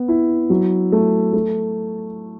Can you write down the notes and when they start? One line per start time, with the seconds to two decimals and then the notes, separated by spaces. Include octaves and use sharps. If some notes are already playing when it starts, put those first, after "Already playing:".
Already playing: B3
0.08 E4
0.50 F#3
0.92 A3
1.33 A3